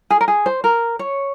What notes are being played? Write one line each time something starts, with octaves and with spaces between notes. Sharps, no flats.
G#4
A#4
G#4
C5
A#4
C#5